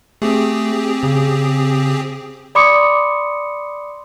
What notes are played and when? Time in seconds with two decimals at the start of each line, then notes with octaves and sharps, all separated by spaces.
0.22 A3 C4 G4 G#4
1.03 C#3
2.55 D5 B5 C6 D6 D#6 C#7